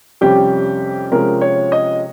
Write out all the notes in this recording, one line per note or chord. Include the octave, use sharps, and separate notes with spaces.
F2 C3 G3 C#4 G4
C3 F3 G#3 C#4 A#4
C#5
D#5